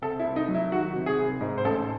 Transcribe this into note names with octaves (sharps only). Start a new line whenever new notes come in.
C3 A4
E4
C2
D#4
F#3
E4
D#3 F#4
C3
G#4
C2
G#2
C5
A1 A4